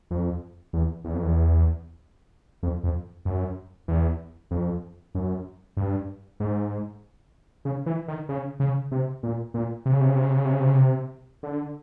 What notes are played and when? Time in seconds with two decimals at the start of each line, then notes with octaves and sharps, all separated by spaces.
0.11 F2
0.73 E2
1.04 E2
1.14 F2
1.23 E2
2.63 F2
2.83 F2
3.25 F#2
3.88 E2
4.51 F2
5.15 F#2
5.77 G2
6.40 G#2
7.65 C#3
7.86 E3
8.08 D#3
8.29 C#3
8.60 C#3
8.92 C3
9.23 A#2
9.54 A#2
9.86 C3
9.93 C#3
10.01 C3
10.08 C#3
10.16 C3
10.23 C#3
10.30 C3
10.38 C#3
10.45 C3
10.52 C#3
10.60 C3
10.67 C#3
10.74 C3
11.43 D3